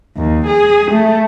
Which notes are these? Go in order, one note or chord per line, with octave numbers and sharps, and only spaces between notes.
D#2
G#4
A3